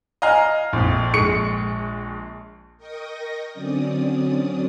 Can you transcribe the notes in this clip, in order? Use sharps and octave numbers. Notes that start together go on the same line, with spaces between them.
D#5 F5 G#5 A#5 F6
A#1 F2
A#1 G#3 C#6 C#7
A#4 D#5 G5 C#6 D#6 A#6
D3 F#3 C4 C#4 D5 D#6